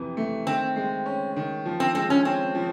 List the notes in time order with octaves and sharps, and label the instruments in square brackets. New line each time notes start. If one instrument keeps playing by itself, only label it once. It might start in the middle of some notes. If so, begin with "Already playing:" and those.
Already playing: [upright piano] F2 C3 E3
A3
[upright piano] D#3 [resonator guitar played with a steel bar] C4
[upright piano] G#3
C#4
D#3
F3
[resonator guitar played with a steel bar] C4
[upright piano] G#3 [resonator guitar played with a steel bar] C4
[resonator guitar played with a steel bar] C#4
[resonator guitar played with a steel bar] C4 [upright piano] C#4
[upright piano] F3